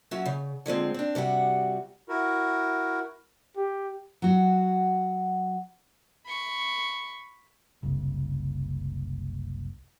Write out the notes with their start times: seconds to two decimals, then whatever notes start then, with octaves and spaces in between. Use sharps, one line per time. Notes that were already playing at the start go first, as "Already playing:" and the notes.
0.11 F#3 C#4 F#4 E5
0.26 C#3
0.66 D3 F3 G#3 C4
0.94 C4 D4
1.15 C3 G3 F#4 F#5
2.09 E4 F#4 A#4
3.57 G4
4.22 F#3 F#4
6.26 B5 C#6
7.83 F#1 C2 C#3